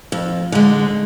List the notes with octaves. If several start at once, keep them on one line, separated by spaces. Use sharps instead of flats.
F2
D3 G#3